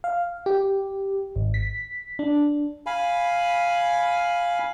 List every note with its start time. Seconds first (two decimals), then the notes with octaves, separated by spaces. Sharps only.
0.04 F5
0.46 G4
1.36 G#1
1.54 B6
2.19 D4
2.86 F5 G#5 B5